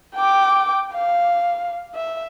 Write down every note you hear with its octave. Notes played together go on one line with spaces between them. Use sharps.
G5 D6
F5
E5